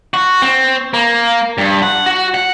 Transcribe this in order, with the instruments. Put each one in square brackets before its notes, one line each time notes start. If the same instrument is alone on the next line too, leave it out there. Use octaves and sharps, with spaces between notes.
[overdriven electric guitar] F#4
C4
A#3
G2
F#5
F#4
F#5